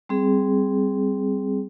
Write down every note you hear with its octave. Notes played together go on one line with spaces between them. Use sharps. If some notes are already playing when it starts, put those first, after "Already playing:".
G3 C4 G#4